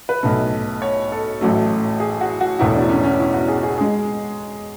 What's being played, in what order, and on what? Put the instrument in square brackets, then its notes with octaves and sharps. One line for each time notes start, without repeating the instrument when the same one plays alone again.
[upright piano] B4
B1 B2 A3
C#5
A4
A1 A2 F#3 A3
G#4
F#4
F#4
E1 E2 B2 A3 E4
D4
C#4
C#4
E4
F#4
G#4
G#4
G#3 G#4